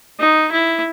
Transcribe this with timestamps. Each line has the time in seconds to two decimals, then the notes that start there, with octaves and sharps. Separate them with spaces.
0.20 D#4
0.51 E4